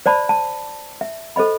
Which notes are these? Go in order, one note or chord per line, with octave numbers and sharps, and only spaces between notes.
C5 D5 A5 B5
A5
E5
A4 C5 D#5 B5